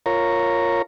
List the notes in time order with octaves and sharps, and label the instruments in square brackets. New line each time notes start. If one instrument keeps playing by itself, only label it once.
[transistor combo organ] F4 A#4 C#5 A#5